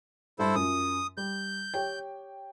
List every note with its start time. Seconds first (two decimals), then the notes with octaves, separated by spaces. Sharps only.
0.39 G2 G3 E4 A4 C5
0.55 F#2 F4 D#6
1.17 G3 G6
1.74 G4 C#5 G5